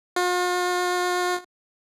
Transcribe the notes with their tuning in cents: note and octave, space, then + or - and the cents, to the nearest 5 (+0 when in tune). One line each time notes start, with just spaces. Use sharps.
F4 +45